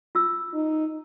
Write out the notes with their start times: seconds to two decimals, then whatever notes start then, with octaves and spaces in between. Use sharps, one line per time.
0.15 F4 E6
0.53 D#4